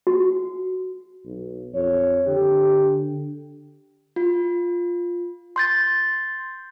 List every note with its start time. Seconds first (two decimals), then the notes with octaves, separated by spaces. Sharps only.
0.07 F#4
1.25 B1
1.74 F2 C#5
2.27 D3 G4
4.16 F4
5.56 C6 G6 A6